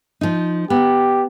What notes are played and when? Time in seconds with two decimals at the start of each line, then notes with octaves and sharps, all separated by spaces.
0.21 F3 D#4
0.70 B3 G4